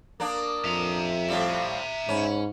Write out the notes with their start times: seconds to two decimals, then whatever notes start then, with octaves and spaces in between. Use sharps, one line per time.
0.20 A#3 D4 A#4 D#6
0.65 F2 E5 A#5
1.29 A2 G3 C4 G4 F5
2.09 G#2 C#4 C#5 B5